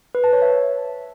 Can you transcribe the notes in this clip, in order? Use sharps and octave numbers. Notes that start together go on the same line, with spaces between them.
B4
A5
C#5
E5